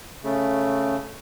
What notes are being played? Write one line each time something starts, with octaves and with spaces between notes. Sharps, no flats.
C#3 A3